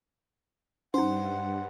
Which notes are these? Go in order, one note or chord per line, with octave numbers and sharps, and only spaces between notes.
G2 C#4 D#4 C5 F#5